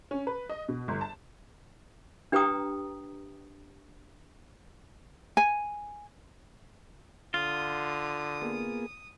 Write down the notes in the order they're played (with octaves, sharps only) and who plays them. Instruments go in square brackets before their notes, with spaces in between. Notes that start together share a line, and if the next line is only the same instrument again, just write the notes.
[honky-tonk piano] C#4
B4
D#5
B2
G1
A5
[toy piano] D4 G4 B4 G5 A#5 D#6
[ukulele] G#5
[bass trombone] D3 [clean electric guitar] F4 [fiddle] D#6
[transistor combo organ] A#3 B3 G#4